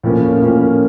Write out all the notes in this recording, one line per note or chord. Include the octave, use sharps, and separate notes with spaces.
A2 F3 A#3 C#4
A2 F3 A#3 C#4